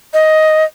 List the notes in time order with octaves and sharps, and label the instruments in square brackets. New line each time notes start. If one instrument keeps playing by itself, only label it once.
[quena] D#5